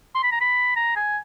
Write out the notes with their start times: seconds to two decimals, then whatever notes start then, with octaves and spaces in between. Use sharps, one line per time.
0.15 C6
0.23 B5
0.32 A#5
0.41 B5
0.76 A#5
0.96 G#5